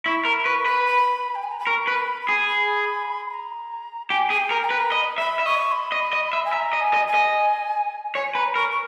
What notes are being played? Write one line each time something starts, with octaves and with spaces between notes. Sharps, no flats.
E4 C#6
A#4 B5
B4 C#6
B4 B5
B5
G5
G#5
A#5
B5
A#4 C#6
B4
B5
B5
G#4
B5
B5
A#5
G4 G#5
G#4 G#5
G5
A#4
A#5
B4
D#5 B5
E5 B5
E5
D#5 C#6
B5
D#5
D#5
E5
G#5
E5 A#5
D#5
G#5
D#5
G#5
D#5
C#5 G#5
B4 A#5
A#4 C#6
C#6